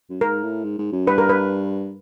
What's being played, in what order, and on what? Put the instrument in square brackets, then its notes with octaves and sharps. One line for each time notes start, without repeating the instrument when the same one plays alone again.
[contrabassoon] F#2
[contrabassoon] G#2 [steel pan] A#4
[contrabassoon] A2
G#2
G#2
F#2
[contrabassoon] G2 [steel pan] B4
[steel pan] A#4
B4